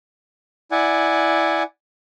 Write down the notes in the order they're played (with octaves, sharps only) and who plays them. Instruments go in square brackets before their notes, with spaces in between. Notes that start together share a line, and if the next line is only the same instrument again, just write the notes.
[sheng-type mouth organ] E4 D5 F#5 G#5